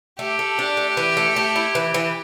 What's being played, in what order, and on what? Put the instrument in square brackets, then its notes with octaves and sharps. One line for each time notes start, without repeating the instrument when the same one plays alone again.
[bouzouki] A3 [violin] G4
[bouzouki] A3
D4
A3
E3
A3
A3
E4
E3
E3